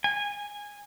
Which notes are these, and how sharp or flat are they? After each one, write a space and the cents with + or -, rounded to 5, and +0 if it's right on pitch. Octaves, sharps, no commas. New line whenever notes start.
G#5 -15